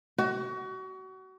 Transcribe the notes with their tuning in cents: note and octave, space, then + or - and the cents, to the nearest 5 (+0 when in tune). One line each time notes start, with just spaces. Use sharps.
F#4 +30